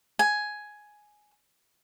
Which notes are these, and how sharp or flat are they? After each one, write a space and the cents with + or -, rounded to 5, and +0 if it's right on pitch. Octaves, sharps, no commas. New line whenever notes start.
G#5 +10